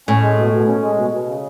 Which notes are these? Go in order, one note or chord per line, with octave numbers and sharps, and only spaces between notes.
A2 C#4
G#3
B2
B2
C#4
G#3
B2
B2
C#3